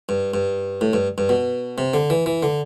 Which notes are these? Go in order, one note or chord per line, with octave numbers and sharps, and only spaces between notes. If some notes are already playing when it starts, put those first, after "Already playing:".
G2
G2
A2
G2
G2
B2
C3
D3
E3
E3
D3